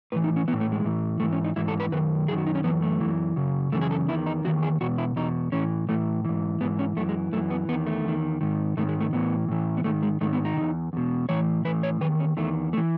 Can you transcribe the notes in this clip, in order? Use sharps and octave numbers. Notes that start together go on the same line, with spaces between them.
A2 E3 B4
D#4
C#4
A2 E3 B3
A3
G#3
A2 E3
G#2 E3 A3
C#4
D#4
G#2 E3 E4
A4
B4
F#2 D#3 B4
F#2 D#3 G#4
F#4
D#4
C#4
F#2 E3 B3
A3
F#2 E3
F#2 C#3
F#2 C#3 E3 A3
G#4
A4
E2 D#3 E4
D#4
E2 D#3 F#4
G#4
E2 B2 F#4
E4
E2 B2 D#4
A2 E3 C#4
A2 E3 A3
G#2 E3
G#2 E3 B3
C#4
F#2 E3 A3
G#3
F#2 E3 A3
B3
E2 D#3 B3
A3
E2 D#3
G#2 D#3
G#2 D#3 A3
G#3
A3
A2 E3 B3
A2 E3
B3
G#2 D#3 A3
G#3
G#2 D#3 A3
B3
D#4
B2
E2
E2 B2
A2 E3 C#5
A2 E3 B4
C#5
E2 D#3 B4
C#4
E2 D#3 A3
A3
E3